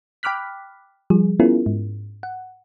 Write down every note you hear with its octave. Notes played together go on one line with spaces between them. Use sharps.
G5 B5 D6 F6 F#6 B6
F3 G3 G#4
B3 C#4 E4 F4 G#4 A#4
G#2
F#5